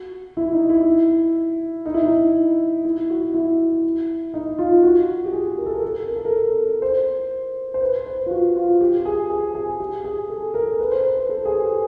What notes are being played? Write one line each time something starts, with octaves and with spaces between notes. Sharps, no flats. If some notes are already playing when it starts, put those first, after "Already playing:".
Already playing: F#4
E4
D#4
E4
D#4
E4
D#4
E4
F#4
E4
D#4
F4
F#4
G4
G#4
A#4
A4
A#4
A4
A#4
A4
A#4
C5
C5
B4
C5
F4
F#4
F4
G4
G#4
G#4
G#4
G4
G#4
A4
A#4
B4
C5
B4
A4
G#4
G4